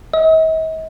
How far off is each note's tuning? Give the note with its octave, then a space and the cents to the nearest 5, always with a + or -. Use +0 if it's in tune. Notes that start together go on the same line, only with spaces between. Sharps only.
D#5 +45